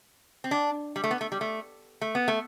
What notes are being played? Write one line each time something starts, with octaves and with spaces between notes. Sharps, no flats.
C4
D4
G3
A3
B3
A3
G3
A3
A3
B3
A3